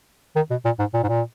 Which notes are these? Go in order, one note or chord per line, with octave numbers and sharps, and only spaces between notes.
D#3
B2
A#2
G#2
A#2
G#2
A#2